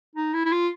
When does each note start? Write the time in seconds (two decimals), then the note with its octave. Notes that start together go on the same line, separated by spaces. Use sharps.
0.15 D#4
0.34 E4
0.45 E4
0.52 F4